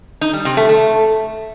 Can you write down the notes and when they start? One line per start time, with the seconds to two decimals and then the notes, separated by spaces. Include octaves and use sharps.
0.21 D#4
0.33 G3
0.45 C3
0.57 A3
0.69 A3